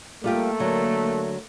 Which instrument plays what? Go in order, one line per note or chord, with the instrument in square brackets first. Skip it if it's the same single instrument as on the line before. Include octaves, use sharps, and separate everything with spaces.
[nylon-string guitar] G3 F4 G4 [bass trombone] A3 [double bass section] A#3
[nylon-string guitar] D3 F#3